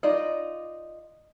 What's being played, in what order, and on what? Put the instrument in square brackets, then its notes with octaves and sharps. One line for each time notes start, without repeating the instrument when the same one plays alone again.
[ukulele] D#4 F4 D5 D#5